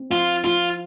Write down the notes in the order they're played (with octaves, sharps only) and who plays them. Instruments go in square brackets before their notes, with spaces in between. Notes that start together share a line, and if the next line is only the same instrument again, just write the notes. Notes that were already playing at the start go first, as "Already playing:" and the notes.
Already playing: [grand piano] C4
[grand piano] F3 [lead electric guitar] F4
[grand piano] F3 [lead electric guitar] F4